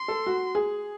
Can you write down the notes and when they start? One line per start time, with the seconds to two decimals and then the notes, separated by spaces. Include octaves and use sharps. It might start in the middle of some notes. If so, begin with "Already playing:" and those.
Already playing: C6
0.08 A4
0.27 F#4
0.55 G#4